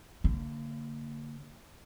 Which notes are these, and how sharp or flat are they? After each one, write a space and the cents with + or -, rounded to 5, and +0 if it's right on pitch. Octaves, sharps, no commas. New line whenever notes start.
D3 -25 A#3 -30